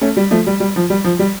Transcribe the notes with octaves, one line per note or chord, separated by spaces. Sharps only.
A3 C#4
G3
F3 A3
G3
G3
F3
G3
F3
G3